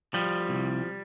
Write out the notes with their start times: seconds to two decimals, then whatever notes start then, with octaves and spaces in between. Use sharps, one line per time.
0.14 F3 G3
0.49 C2